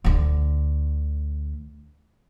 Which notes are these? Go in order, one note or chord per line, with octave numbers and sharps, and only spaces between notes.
D2 D3